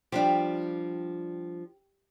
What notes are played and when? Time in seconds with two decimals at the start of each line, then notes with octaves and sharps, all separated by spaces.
0.12 F3 G3 D4 G4